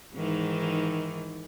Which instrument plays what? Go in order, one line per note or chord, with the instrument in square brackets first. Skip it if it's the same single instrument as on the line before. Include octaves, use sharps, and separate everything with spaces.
[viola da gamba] G#2 D#3 E3